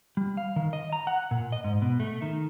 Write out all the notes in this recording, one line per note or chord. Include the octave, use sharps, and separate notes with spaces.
G3
F5
D#3
D#5
A#5
F#5
A#2
D#5
G#2
B2
A3
D#3